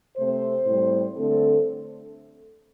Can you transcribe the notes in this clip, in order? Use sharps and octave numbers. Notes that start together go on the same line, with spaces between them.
C3 A3 C4 C5
A2 G3 C4
D3 A3 C4 A4